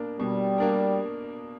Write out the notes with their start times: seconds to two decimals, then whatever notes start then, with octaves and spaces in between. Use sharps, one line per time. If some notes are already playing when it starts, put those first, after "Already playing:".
Already playing: B2 A#3 D4 A#4
0.20 B2 G3
0.58 A#3 D4 A#4